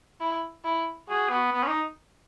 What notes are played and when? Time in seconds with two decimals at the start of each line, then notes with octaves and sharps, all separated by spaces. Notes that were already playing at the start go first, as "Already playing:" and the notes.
0.21 E4
0.65 E4
1.08 F#4 G#4
1.30 B3
1.52 B3
1.63 C#4
1.67 D#4